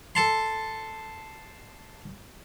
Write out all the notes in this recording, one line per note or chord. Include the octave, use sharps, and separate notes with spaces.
A4 A5 C6